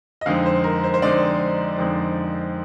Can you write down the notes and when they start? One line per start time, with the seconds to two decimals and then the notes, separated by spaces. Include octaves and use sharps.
0.21 D#5
0.26 F2 D3 G#3 C4 D#4 F5
0.46 C5
0.64 A#4
0.84 C5
0.94 C5
1.02 F2 D3 G#3 C4 D#4 D5
1.78 F2 D3 G#3 C4 D#4